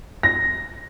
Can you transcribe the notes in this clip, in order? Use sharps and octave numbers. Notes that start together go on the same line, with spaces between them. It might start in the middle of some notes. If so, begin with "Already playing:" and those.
A#6